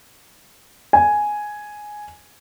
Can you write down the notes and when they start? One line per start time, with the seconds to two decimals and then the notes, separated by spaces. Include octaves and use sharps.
0.93 G#5